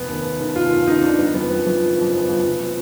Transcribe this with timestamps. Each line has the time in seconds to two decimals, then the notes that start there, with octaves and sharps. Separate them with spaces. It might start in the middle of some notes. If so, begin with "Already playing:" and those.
Already playing: F1 B3
0.08 D#2 D#3
0.24 F1
0.40 D#2 D#3
0.56 F1 F4
0.71 D#2 D#3
0.87 F1 D#4
1.03 D#2 D#3 D4
1.18 F#1 B3
1.34 F2 F3 B3
1.50 F#1 B3
1.65 F2 F3
1.81 F#1
1.97 F2 F3
2.13 F#1 B3
2.28 F2 F3
2.44 F1
2.63 F3